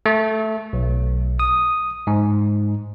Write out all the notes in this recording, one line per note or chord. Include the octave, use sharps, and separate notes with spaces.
A3
B1
D#6
G#2